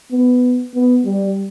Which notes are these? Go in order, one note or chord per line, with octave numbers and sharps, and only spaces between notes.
B3
B3
G3